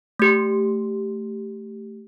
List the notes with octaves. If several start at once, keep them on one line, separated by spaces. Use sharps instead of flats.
A3 G4